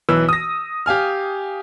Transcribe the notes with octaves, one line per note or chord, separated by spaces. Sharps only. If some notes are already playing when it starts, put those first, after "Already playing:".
B1 E3 B4 E6
D#6 A#6
G4 F5 G#5 F6